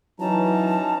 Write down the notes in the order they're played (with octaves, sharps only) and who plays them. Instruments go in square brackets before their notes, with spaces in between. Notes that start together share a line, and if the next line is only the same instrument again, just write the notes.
[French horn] E3 [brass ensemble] F#3 [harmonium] C#4 D#4 A#5 [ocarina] A5